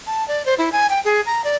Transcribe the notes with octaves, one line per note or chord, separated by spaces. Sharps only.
A5
D5
C5
E4
G#5
G5
G#4
A#5
D5